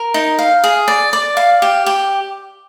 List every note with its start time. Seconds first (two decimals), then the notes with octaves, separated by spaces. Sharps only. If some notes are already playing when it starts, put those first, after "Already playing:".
Already playing: A#4
0.14 D#4
0.39 F5
0.64 G#4
0.88 D5
1.13 D5
1.37 F5
1.62 G4
1.86 G4